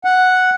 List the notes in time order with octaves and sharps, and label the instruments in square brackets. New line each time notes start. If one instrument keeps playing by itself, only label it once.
[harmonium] F#5